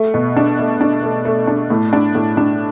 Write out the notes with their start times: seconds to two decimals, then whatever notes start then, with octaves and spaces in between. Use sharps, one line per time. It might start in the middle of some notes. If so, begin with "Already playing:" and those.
Already playing: A3
0.14 B2
0.36 D4
0.59 A3
0.81 D4
1.03 A3
1.25 A3
1.47 D4
1.70 A2
1.93 D4
2.15 A2
2.37 D4